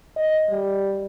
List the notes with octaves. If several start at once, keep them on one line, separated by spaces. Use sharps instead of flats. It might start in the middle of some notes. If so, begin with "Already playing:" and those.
D#5
G3